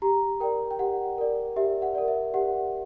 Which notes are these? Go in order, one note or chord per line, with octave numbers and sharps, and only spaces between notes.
G4 A#5
A#4 D5 G5
G5
G4 F#5
A#4 D5
G4 E5
F#5
A#4 D5
E5
G4 F#5